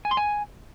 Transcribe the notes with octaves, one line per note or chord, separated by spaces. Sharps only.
G#5
C6
G#5